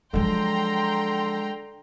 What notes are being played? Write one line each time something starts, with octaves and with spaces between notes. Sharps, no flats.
D3 F3 F#3 G#3 G5 A#5 C6